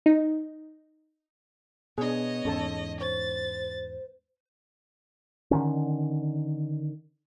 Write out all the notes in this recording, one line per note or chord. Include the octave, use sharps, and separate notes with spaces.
D#4
B2 B3 D4 G#4 C#5 D#5
E2 G#2 C#4 A4 A5
C5 C#5 A6
D3 D#3 C#4